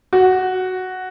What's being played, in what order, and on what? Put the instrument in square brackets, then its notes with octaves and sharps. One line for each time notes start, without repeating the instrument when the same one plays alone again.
[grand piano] F#4